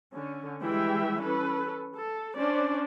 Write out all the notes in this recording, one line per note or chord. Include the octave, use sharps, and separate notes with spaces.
D3 C#4
E3 G3 G#3 E5 G5
C#4 A4 B4
A4
C#4 D4 C5 D5